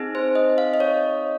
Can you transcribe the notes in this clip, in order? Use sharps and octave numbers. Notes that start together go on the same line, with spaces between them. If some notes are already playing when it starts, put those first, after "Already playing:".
Already playing: C4 D#4 G#4
C5
D#5
F5
D#5
C#5